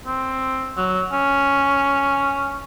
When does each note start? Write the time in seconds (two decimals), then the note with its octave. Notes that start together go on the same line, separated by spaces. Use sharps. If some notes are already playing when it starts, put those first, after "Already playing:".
0.06 C4
0.77 F#3
1.12 C#4